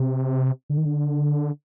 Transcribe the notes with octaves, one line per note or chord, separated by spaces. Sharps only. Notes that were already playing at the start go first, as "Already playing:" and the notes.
Already playing: C3
D3
D#3
D3